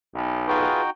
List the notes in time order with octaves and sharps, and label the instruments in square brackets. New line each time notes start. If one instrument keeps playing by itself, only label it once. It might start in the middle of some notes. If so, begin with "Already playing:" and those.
[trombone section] B1
[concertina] D#4 F#4 G5 [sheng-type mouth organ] F4 G#4 B4